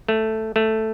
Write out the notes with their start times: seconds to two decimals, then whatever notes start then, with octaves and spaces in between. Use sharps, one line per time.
0.08 A3
0.56 A3